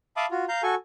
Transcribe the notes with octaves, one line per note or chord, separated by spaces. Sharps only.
E5 F5 A5 B5 D6 D#6
F4 F#4
F5 A#5 G6
F#4 A4 G#5 C#6